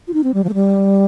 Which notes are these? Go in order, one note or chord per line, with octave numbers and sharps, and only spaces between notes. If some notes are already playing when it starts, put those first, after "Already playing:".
F4
D#4
C4
G3
F3
A3
G3